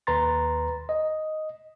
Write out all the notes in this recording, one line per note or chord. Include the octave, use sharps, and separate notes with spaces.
D#2 B4 A#5 C6 A6
D#5